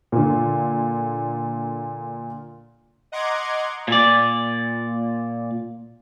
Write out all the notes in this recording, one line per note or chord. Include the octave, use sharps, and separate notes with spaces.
A#2 D3
D#5 F#5 A#5 C6 D6 G#6
A#2 D5